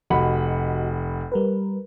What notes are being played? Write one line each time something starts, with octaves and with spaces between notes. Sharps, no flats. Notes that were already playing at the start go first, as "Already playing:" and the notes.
F1 F#4 D#5 F#5 B5
G3 A#4 B4